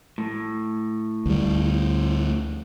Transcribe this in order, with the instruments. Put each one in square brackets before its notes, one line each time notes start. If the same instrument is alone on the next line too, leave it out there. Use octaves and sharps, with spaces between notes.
[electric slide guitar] A2
[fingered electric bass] D2 G3